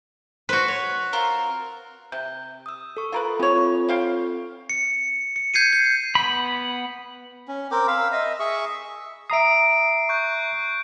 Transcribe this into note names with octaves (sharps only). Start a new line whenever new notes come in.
F#4 B4 C5
C#5
C4 F4 A#4
C3 G6
D#6 E6
A4 C#6
F4 A#4 B4
E3 C4 F4 A4 C#5
C5 F5 G5
C#7
C#7
G6 G#6 C7 C#7 D#7
G6
B3 B5
C#4
C4 A#4 G5 D6
F5 B5 E6
D#5 E5
G#4 E5 C#6
E5 A#5 D#6 C7 D7
C#6 F#6 G6